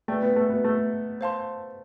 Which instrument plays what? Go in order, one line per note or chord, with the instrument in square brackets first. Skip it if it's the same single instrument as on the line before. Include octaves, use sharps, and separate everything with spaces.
[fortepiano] A3 [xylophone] B4 D5 G5
[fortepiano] B3
A3
B3
A3
[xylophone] C5 F5 A5 C6